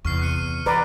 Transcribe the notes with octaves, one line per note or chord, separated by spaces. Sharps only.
E2 C3 C#6 F6 C7
F#6 C#7 D#7
E3 B4 D5 A#5 F6